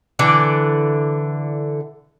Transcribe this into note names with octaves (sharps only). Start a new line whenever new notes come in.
D3 E3 D5